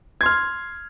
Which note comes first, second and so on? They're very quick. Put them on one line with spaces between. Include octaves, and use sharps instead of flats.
G#6 C6 F6